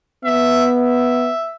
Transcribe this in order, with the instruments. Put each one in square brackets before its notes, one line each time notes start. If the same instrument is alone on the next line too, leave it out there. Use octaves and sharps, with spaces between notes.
[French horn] B3 [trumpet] E5
[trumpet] E5